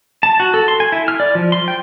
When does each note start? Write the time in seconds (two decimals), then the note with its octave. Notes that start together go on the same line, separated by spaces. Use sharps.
0.23 A5
0.40 F#4
0.54 A4
0.68 C6
0.80 G#5
0.92 E4
1.08 F6
1.20 D5
1.35 F3
1.52 C6
1.68 G5